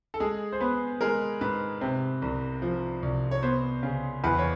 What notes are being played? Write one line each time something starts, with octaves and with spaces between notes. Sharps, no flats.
A4
G#3 G#4
C5
B3 B4
G#3 A#4
G#2 B4
C3
C2
F3
C2
C#5
B3 C5
C#3
E2 B4
C#5